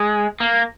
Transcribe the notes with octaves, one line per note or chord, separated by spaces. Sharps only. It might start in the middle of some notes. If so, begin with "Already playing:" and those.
Already playing: G#3
A#3